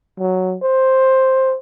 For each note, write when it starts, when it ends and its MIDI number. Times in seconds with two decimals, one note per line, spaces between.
0.18 0.56 54
0.62 1.56 72